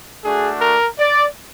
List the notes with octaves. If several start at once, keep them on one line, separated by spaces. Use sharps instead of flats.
A3 D4 F#4 G#4
A#4
D5